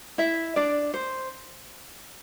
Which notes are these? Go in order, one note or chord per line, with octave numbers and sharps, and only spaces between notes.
E4 E5
D4 D5
C5